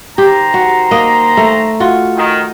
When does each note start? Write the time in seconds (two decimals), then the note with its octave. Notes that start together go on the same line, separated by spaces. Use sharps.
0.18 D#3 G4 C5 A#5
0.54 F#4
0.91 A#3 D#5
1.37 A3
1.80 F4 F#4
2.17 D#3